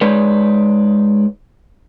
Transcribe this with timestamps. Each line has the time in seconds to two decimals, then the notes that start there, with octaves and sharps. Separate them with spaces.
0.01 G#3 D#4 B4 C#5 D5